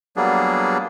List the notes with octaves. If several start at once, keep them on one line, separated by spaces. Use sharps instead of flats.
F#3 G3 A#3 B3 D4 G#4